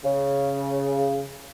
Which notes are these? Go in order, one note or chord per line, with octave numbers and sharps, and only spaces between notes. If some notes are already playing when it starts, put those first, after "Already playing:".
C#3